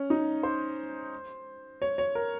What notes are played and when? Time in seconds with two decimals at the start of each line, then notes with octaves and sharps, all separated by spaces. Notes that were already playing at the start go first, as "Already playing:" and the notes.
Already playing: C#4
0.10 D#4
0.43 C5
1.82 C#5
1.98 C#5
2.15 A#4